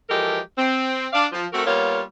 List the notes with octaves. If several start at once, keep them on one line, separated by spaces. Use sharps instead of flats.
E3 F3 G#3 G4 A4 A#4
C4
D4 D5 F5
F3
A3 C4 F#4 A4 A#4
G3 A#3 B3 F4 A#4 C#5